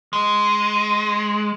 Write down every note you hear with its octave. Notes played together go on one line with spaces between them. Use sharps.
G#3